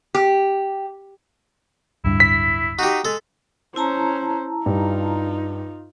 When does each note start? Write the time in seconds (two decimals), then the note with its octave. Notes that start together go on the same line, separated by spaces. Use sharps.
0.15 G4
2.05 D1 G2 E4
2.20 B6
2.79 D#4 F#4 G4
3.05 G#3 A4
3.76 C#4 E4 C5 A5 A#5
4.66 G2 D#4 F4